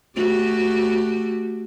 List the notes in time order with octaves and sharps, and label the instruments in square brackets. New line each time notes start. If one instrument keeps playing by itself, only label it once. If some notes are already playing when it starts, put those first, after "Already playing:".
[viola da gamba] A3 F#4 G4